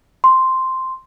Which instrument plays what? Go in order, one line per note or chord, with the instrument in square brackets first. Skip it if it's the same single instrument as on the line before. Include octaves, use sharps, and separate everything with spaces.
[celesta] C6